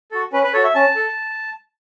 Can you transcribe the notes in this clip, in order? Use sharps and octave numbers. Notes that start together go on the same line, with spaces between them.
F#4 A4
C#4 B4
B4
F#4 A4 C#5
E5
C#4 A5
A4